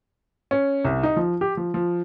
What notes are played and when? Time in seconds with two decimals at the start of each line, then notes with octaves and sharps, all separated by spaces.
0.51 C#4
0.85 C2
1.03 D#4
1.16 F3
1.41 G4
1.57 F3
1.74 F3